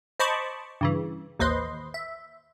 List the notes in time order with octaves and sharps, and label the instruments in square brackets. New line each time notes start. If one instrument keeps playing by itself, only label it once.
[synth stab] C5 D#5 A5 B5 C#6 D6
G2 C#3 E3
A1 D#2 B4 C5 D#5 C6
E5